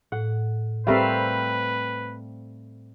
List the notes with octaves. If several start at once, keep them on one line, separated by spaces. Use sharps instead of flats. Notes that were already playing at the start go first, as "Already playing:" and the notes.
A2 F#5
G3 A3 C4 A#4 B4 E5 F5